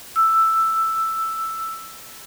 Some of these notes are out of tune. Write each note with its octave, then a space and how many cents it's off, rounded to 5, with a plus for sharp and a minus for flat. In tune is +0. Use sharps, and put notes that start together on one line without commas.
E6 +5